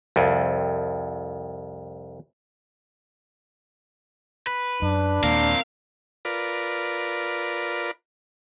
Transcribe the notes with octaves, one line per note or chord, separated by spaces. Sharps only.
C2 F2
B4
F#2 D4
D#2 A#2 C4 A#4 F5
F4 A#4 B4 D5